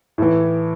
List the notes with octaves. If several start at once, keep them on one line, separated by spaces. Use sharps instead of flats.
A2 E3